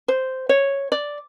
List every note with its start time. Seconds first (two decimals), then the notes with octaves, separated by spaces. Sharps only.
0.08 C5
0.49 C#5
0.92 D5